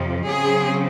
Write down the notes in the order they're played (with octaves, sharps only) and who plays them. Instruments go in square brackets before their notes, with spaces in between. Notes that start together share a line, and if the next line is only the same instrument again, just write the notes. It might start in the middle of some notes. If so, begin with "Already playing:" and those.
Already playing: [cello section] F2 C3 F3
C#3 F#3 C4 G#4